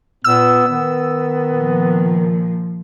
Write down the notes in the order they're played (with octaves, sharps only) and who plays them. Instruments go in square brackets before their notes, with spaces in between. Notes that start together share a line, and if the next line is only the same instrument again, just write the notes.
[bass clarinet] A#2 [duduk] B3 [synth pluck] E6
[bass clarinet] D#3 [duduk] B3
[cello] A#2 F3